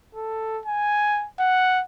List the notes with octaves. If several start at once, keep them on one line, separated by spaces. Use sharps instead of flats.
A4
G#5
F#5